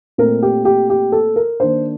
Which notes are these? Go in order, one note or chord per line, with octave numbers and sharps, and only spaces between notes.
A#2 A3 C4 A#4
G4
G4
G4
A4
A#4
D#3 A#3 D4 C5